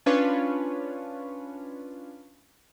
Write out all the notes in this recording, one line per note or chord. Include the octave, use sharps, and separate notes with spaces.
C#4 D4 F4 B4 C#5